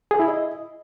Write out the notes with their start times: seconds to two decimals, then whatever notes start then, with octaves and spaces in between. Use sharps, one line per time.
0.11 G#4
0.20 E4
0.28 D#5